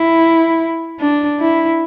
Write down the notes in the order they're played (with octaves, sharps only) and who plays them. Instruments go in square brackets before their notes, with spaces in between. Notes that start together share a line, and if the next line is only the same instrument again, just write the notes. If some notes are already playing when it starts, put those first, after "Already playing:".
Already playing: [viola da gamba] E4
D4
E4